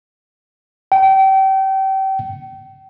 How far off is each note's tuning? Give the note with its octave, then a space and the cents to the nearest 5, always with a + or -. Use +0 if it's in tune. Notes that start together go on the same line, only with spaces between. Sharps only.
G5 -30